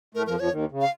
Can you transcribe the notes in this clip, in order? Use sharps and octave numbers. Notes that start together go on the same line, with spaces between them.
A2 A3 A#4
F2 F3 A#4
F2 F3 C#5
D#2 D#3
C#3
F5